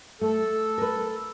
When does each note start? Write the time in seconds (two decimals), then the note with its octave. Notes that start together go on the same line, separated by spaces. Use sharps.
0.21 A3 A4
0.78 A#4 B4